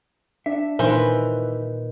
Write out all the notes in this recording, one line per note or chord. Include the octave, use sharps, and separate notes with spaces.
D4 E5
A#2 D#3 E3 B4 C5